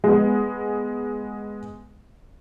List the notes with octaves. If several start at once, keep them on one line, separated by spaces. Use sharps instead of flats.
G#3 B3